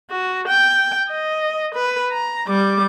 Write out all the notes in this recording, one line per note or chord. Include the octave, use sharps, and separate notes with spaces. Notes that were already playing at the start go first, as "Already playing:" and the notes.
F#4
G5
D#5
B4
A#5
G3 D6